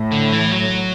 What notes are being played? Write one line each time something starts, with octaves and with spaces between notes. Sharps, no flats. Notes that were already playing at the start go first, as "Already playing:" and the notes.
Already playing: A2
D3
E3
F#3